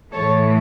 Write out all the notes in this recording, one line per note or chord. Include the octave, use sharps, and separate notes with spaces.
A2 E3 A3 A4 C#5